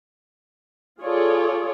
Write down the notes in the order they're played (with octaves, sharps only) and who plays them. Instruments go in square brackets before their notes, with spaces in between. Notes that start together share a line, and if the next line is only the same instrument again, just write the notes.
[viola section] F4 G#4 A4 C#5 D5